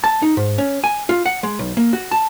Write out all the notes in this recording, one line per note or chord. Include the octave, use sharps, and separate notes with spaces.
A5
D#4
G#2
C#4
G#5
F4
F#5
G#3
B1
A#3
F#4
A5